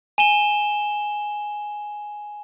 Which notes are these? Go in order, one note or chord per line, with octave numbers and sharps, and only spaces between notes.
G#5 E7 G7